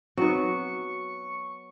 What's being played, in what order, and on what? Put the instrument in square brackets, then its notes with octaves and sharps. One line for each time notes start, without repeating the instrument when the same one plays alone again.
[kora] F#3 B3 [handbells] C4 D#4 [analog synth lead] C#6